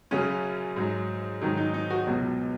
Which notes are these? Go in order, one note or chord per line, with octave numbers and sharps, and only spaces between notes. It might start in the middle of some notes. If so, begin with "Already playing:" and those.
F#2 C#3 F#3 C#4
G#2 F#3
G#2 D#3 F#3 D#4
D#4
D#4
F#4
C#2 B2 F#3